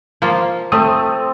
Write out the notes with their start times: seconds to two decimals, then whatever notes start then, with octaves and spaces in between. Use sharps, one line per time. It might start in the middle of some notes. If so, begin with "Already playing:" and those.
0.22 F3 A#3 F4
0.72 A3 C4 A4 D#6